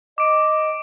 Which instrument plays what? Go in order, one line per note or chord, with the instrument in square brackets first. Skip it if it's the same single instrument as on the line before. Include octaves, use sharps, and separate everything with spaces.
[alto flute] D#5 [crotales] D6 D7